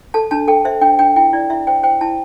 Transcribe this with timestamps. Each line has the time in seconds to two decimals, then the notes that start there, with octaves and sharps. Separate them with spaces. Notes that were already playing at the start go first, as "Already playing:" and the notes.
0.14 A4 A5
0.31 D4 A5
0.48 A4 G5
0.65 C5 E5
0.82 D4 G5
0.99 D4 G5
1.16 E4 G5
1.33 E4 D5
1.50 E4 E5
1.67 C5 G5
1.83 C5 G5
2.01 E4 A5